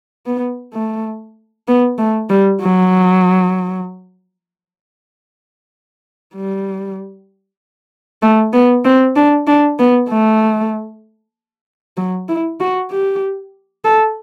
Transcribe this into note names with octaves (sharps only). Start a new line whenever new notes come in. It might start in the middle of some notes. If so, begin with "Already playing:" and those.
B3
A3
B3
A3
G3
F#3
G3
A3
B3
C4
D4
D4
B3
A3
F#3
E4
F#4
G4
A4